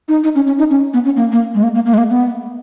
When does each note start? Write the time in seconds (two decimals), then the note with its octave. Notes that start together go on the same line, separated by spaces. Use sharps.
0.08 D#4
0.24 D#4
0.35 C#4
0.47 C#4
0.58 D#4
0.70 C#4
0.94 B3
1.05 C#4
1.17 A#3
1.32 A#3
1.55 G#3
1.63 A#3
1.75 A#3
1.86 A#3
1.94 G#3
1.98 A#3
2.09 B3